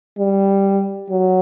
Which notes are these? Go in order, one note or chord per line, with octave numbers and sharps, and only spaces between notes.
G3
F#3